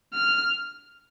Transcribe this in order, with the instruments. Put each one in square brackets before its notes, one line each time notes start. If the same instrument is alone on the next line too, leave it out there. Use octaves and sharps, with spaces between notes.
[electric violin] F6